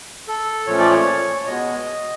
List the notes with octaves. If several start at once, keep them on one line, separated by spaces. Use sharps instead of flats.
A4
A#2 F3 A3 C#4 C#5
D5
C#5
B2 G#3 B3 D#5